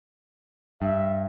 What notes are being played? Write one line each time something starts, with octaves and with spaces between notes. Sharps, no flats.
G2 E5